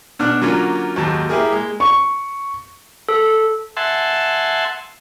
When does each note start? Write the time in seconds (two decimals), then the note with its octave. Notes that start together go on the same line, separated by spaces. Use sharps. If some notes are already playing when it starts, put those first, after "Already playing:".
0.19 B2 D4 F6 F#6
0.41 D3 F#3 A#3 C#4 F4
0.96 D#2 G#2 F#3 A5
1.29 A#3 E4 G4 G#4 A#4
1.52 G#3
1.80 C#6
3.09 A4
3.77 E5 F#5 G#5 A5 C6